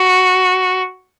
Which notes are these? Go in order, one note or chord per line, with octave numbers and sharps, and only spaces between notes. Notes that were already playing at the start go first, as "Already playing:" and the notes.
Already playing: F#4